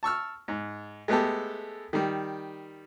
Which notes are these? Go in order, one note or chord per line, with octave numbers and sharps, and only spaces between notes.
A5 C#6 E6 F6
G#2
G#3 A3 B3 G4 A4
D#3 G3